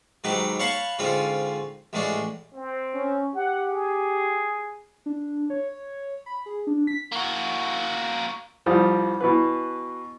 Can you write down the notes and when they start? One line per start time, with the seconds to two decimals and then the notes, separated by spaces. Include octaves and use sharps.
0.24 G#2 D#3 F#3 G4 B4
0.59 C#5 F5 F#5 A5 B5 C#6
0.99 G#2 D3 C4 C#4 F4
1.93 A1 A2 G#3 C#4 D4
2.53 C4
2.95 C#4
3.35 G4 F#5
3.69 G#4
5.06 D4
5.50 C#5
6.26 B5
6.46 G#4
6.67 D4
6.87 B6
7.12 A#3 F#4
8.66 C2 F3 G3 D#6
9.21 B2 E3 B4